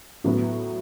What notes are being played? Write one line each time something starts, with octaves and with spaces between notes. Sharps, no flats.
A2 F#3 B3 F#4